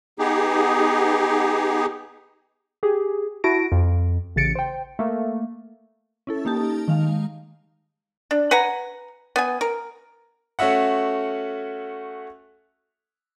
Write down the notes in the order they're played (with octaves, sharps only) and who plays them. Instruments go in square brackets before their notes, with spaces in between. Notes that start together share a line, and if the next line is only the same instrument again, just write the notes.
[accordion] B3 D#4 G4 G#4
[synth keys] G4 G#4
E4 F#4 A5 A#6 D7
F2
A1 C#3 A6 C#7 D7
C5 G5
A3 A#3
[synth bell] C#4 E4 A4
A#3 D#4 G4 A5
D#3 G#3 F5
[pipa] D4
B4 F#5 G#5 A#5
B3 G#5
A#4
[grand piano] A3 C#4 F#4 E5 F#5